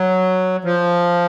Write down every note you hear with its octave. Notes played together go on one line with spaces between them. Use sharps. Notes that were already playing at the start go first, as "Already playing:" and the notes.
Already playing: F#3
F3